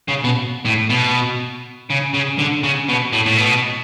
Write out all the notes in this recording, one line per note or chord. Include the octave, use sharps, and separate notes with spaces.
C#3
B2
A2
B2
C#3
C#3
D3
C#3
B2
A2
A2
B2